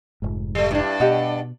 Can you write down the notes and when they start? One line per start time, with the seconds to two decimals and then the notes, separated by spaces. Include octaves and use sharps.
0.22 F1 G#2
0.55 G3 A3
0.71 G2 D4 E4
1.00 B2 G4 D#5 F#5